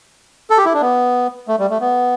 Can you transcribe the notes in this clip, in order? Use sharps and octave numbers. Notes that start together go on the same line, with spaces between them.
A4
G4
E4
D4
B3
A3
G3
A3
B3